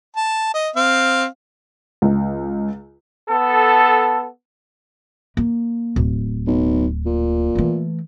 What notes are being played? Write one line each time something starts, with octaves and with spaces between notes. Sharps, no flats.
A5
D#5
C4 F5
C#2
B3 A4
A#3
D1
B1
A#2
E3 A3